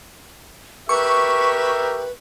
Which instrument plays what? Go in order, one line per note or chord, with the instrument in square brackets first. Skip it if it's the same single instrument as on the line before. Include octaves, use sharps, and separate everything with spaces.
[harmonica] G4 A#4 E5 [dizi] B4 [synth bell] C#6